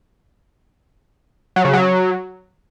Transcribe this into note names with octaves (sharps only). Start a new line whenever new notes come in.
F#3
C#3
F#3